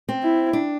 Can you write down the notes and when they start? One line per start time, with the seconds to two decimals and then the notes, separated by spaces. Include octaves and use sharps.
0.09 C4
0.23 E4
0.53 D4